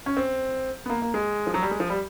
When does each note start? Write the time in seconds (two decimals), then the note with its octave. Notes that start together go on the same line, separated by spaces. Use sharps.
0.06 C#4
0.17 C4
0.86 B3
0.90 A#3
1.02 A#3
1.14 G#3
1.47 F3
1.54 F#3
1.63 G3
1.71 G#3
1.80 F3
1.90 G3